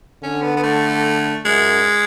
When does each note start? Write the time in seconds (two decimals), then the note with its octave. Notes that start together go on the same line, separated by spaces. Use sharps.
0.23 D3 C#4
0.42 B3
0.57 B3
0.63 A3
1.45 F#2 G#3